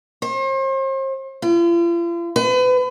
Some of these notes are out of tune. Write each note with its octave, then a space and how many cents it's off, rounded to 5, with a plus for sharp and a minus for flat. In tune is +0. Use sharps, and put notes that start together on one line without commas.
C5 +40
F4 -45
B4 +35